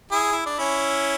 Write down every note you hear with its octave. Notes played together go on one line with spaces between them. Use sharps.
E4 G#4
E4
D4
C#4 E4